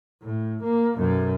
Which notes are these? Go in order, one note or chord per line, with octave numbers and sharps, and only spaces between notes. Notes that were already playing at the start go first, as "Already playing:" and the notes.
A2
A#3
B1 F#2